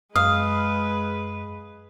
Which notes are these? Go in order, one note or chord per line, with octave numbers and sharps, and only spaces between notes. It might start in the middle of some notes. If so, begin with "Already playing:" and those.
F#2 G#3 B4 F5 D#6